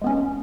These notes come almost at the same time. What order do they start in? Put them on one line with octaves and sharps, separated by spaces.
G#3 B3 C#4